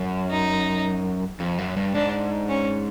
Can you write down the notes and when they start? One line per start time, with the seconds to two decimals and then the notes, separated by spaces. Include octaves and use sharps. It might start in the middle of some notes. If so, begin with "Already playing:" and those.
Already playing: F#2
0.31 D#4
1.40 F2
1.58 F#2
1.77 G2
1.94 G#2 D4
2.49 C#4